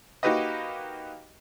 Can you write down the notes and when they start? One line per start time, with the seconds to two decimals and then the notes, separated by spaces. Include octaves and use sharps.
0.23 A#3 D#4 F#4 G4 B4 D#5